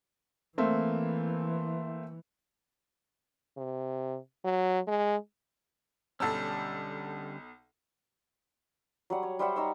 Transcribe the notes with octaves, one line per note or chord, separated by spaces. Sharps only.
E3 A3 A#3 C4
C3
F#3
G#3
B1 D3 G3 C#4 A4 E6
F#3 G3 F#5
C#5
G3 C5 E5 F#5
D#4 C#5 E6